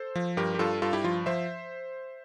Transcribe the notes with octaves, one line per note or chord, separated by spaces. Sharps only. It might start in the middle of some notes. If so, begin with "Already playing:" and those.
Already playing: A4 C5
F3
G2 G4 A#4
G4
G2 F4 A4
G2 F4 A4
E4 G4
F3 F4
F3 C5 E5